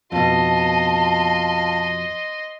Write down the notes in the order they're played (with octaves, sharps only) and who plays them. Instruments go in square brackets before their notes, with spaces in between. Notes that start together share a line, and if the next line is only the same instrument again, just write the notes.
[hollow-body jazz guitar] F2 B2 [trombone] F4 [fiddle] D#5 C6 [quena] A5